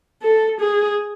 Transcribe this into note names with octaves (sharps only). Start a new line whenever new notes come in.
A4
G#4